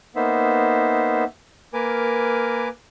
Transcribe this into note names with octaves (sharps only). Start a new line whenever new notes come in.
A#3 B3 D#4 C5 E5
A#3 A#4 B4 G#5 D6